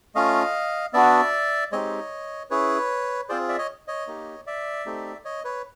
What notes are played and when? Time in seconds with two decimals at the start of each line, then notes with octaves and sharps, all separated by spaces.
0.15 A3 C#4 F4 D#5 F5
0.93 B3 D4 F#4 D5 E5
1.72 G#3 C4 D#4 G4 C#5 D#5
2.50 C#4 E4 G#4 B4 C#5
3.29 C4 F4 G#4 C5 D5
3.49 D5 E5
3.58 C#5 D#5
3.88 C#5 D#5
4.07 A#3 D#4 G4
4.47 D5 E5
4.86 A3 C4 D#4 G4
5.25 C#5 D#5
5.44 B4 C#5